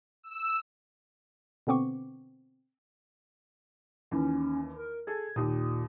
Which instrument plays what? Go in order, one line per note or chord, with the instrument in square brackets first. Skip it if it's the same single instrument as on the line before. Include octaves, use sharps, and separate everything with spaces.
[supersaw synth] E6
[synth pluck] B2 D3 B3 C4 C#6 D6
[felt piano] D#2 E3 [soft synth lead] C#4
[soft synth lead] A#4
[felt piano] G#4 A4 [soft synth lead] G#6
[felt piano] D#2 G4 D#6 [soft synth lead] A#2